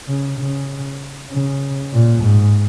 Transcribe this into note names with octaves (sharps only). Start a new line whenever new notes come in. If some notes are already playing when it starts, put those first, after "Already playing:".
C#3
C#3
C#3
A#2
G#2